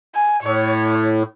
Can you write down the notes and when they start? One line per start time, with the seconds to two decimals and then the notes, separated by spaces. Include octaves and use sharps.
0.15 G#5
0.43 A2 C#5